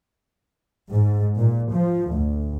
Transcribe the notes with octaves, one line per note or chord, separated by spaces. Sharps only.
G#2
A#2
F3
D2